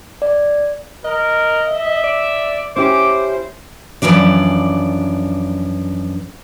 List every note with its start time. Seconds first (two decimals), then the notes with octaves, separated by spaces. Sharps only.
0.22 D5
1.05 A#4 D#5
1.68 E5
2.04 D5
2.76 C#4 E4 G4 C5 D6
4.02 F#2 E3 F3 D4 D5